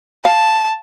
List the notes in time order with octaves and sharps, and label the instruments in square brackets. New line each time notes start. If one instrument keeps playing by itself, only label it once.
[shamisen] F5 [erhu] A5